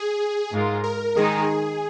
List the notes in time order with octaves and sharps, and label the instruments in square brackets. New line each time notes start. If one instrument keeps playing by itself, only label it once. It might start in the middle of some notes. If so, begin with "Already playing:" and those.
Already playing: [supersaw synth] G#4
[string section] G#2 G#3 F4 A#4
[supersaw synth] A#4
[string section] D#3 G#3 D#4 [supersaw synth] G#4